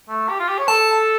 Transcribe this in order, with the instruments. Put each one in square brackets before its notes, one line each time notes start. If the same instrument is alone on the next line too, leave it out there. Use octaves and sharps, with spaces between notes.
[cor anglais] A3
G4
F4
G4
C#5
[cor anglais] A4 [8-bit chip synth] A5